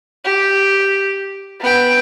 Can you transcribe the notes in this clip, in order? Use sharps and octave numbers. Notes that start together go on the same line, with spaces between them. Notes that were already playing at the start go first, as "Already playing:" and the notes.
G4
B3 G5